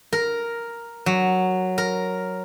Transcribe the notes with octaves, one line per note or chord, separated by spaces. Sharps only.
A#4
F#3
A#4